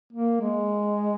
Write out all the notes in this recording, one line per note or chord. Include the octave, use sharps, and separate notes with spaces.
A#3
G#3